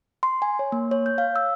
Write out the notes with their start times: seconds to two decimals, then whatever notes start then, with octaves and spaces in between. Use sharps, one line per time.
0.23 C6
0.42 G#5
0.59 C#5
0.72 A#3
0.91 C#5
1.06 G6
1.18 F5
1.36 E6